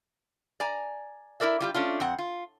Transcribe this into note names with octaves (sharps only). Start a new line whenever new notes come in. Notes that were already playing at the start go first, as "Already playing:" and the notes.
D5 G#5 A#5
E4 F#4 A#4 D5 E5
G3 F4 G4
A3 C#4 D4 F4
F2 C4 F#5
F4